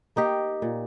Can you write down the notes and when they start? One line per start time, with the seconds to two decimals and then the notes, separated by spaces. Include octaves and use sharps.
0.16 A#3 D#4 G4
0.62 A#2